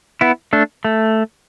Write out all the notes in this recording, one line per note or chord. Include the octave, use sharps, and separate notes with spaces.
B3 E4
A3 D4
A3